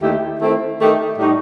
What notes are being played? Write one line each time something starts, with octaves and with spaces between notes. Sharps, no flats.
D#2 D#3 A3 E4 G4
D#3 A3 C4 E4
D#3 A3 D#4 G4
A2 G3 D#4 F#4